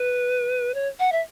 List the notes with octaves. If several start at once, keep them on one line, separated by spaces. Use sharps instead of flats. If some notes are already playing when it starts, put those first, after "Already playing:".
Already playing: B4
C#5
F#5
E5